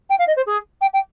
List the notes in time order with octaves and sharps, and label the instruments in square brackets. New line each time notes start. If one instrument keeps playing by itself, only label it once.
[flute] G5
F5
D#5
C5
G#4
G5
G5